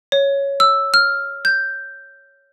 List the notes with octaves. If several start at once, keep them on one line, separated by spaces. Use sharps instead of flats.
C#5
E6
F6
G6